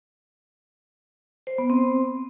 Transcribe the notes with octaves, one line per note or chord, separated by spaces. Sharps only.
C5
B3
C4